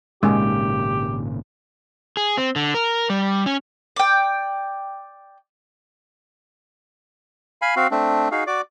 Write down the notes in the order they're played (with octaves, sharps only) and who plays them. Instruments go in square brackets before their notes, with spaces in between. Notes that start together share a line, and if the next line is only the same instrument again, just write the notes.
[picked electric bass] G#1 A#2 C#3 [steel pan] G#3 [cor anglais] G4
[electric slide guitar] G#4
C4
D3
A#4
G3
C#4
[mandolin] D5 G5
[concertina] F5 G#5 B5
C4 F#4 F5
A3 C4 D4
D#4 F#4 G#4 F5
F#4 D5 D6